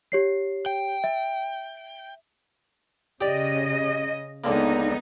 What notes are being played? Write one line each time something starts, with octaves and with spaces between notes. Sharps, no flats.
G4 C#5 C7
G5
E5
C#3 G4 D5 D#5
C#2 D3 A#3 B3 D#4